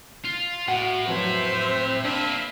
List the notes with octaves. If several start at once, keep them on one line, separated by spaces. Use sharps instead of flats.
F4
A2 F#4 F#5
F2 F#3 B4 C5 E5
C4
A#3 D4 B4 E5